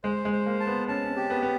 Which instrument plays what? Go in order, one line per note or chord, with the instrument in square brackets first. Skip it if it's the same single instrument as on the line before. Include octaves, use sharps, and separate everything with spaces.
[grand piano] G#3 [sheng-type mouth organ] C5
[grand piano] G#3
[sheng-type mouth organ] C5
[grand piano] A#3
[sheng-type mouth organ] A5
[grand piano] B3
[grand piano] C#4 [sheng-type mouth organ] A5
[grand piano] C#4
C4
[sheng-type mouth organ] G4
[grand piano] B3
B3